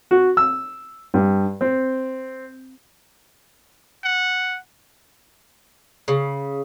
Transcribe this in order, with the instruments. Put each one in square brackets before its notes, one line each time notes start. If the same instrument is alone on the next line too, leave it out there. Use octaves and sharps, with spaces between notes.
[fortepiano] F#4
E6
G2
C4
[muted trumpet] F#5
[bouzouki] C#3